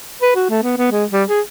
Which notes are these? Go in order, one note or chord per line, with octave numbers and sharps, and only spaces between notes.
B4
F#4
A3
B3
B3
G#3
G3
G#4